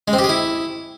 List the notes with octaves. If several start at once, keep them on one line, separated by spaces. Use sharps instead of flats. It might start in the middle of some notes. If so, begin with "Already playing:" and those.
G#3
C4
G4
G#4
E4